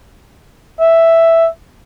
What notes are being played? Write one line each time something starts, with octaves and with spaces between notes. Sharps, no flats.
E5